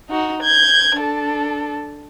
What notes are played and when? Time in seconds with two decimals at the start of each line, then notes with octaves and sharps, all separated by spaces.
0.10 D#4 F#4
0.43 G6 G#6
0.96 D4 A4